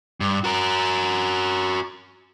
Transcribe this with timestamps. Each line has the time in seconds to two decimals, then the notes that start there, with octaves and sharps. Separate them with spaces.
0.20 G2
0.44 F#4 A#4